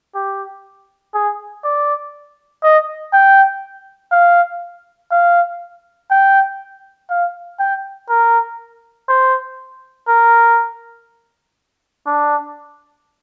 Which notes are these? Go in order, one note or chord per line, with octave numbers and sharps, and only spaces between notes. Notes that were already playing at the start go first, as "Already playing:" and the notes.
G4
G#4
D5
D#5
G5
F5
F5
G5
F5
G5
A#4
C5
A#4
D4